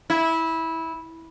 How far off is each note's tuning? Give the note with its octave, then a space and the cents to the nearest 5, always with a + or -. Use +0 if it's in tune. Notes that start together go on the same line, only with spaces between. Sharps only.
E4 -15